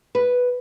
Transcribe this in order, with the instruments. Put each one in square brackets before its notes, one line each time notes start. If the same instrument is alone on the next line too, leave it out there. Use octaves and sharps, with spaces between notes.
[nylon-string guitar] B4